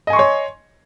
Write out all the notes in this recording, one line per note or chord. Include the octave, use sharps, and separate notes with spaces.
C#5 D#5 G#5 C6 C#6